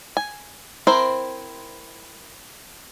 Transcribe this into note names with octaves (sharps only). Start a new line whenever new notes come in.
G#5
C4 E4 A#4 C5